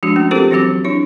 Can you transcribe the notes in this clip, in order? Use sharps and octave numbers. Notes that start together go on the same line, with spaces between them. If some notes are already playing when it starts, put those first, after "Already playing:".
F3 G#3 D4 F#4
A3 C#4 F#4
C4 F4 G4 A4 A#4 C5
E3 F#3 C4 F#4 D6
D4 E4 C#5